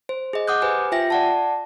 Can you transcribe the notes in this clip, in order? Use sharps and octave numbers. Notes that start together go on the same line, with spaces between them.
C5
G#4 D#5
F#5 D6 D#6 F#6 G6
G4 B4 C5 G#5
F4 E5 G5 A#6
D5 F#5 A5